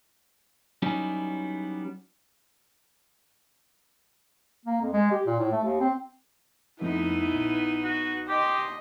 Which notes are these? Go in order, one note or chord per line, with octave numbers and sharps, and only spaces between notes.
F#3 G3 B3 C#4 D#4 E4
A#3
F2
G#3
G4
A#2
A2
A3
D#2
C4
F2 A3 B3 D#4 E4
A#1
F#4
G4 D#5 C6